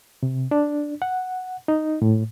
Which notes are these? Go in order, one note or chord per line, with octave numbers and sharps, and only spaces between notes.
C3
D4
F#5
D#4
A2